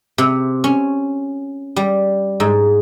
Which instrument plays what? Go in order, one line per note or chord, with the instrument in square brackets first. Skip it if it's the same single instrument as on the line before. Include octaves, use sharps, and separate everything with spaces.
[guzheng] C3
C#4
G3
G#2